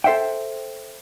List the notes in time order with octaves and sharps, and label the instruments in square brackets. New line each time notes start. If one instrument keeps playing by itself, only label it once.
[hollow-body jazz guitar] A4 C5 E5 F#5 G5